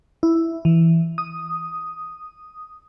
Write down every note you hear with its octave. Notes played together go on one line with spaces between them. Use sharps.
E4
E3
D#6